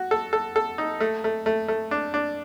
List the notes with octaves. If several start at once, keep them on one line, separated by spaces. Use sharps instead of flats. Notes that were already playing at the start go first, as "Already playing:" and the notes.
Already playing: F#4
A4
A4
A4
D#4
A3
A3
A3
A3
D4
D4